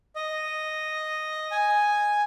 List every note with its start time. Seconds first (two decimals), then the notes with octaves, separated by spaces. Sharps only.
0.16 D#5
1.51 G#5